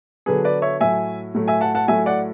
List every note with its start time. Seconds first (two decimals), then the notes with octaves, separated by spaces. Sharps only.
0.26 D3 F#3 B3 G#4 B4
0.44 B4 D5
0.62 C#5 E5
0.81 A2 F#3 A3 E5 G#5
1.34 A2 F#3 A3
1.48 E5 G#5
1.61 F#5 A5
1.75 F#5 A5
1.88 A2 F#3 A3 E5 G#5
2.06 D5 F#5